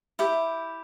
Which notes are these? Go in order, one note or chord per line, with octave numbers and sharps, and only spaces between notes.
E4 G4